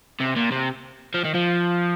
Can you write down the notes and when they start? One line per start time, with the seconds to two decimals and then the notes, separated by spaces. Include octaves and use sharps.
0.20 C3
0.36 A#2
0.52 C3
1.14 F3
1.24 D#3
1.34 F3